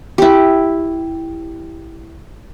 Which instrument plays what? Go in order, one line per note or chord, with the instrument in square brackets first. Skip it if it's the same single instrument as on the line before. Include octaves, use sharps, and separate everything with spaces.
[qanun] E4 G4